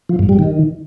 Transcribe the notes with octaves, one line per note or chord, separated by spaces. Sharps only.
F3
G2
G3
D#3